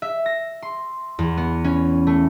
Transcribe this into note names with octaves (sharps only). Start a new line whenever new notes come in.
E5
A#6
C6
E2
B3
C#4
A3